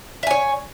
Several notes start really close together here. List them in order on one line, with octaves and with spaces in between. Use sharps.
E5 G#5 C#5